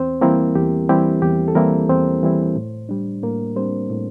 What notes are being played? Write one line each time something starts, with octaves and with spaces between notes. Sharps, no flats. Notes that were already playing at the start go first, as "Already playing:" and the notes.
Already playing: E2 C4 C5
E3 G3 A#3 C4 E4 A#4
E2 G4
E3 G3 C4 E4 G4
E2 G4
A4
E3 G3 A#3 C4 E4 A#4
E2 C4 C5
E3 G3 C4 E4
A2
G3 D4
A2 A#3 A#4
G3 C4 D4 C5
A2